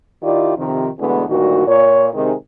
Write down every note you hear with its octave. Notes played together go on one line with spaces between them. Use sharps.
D#3 E4 F4 G4 D5
F2 C3 D#3
E2 B2 D3 G#3 A3 B3
D2 G2 A#2 D#3 F#4
A#2 C#5
C3 D#3 G#3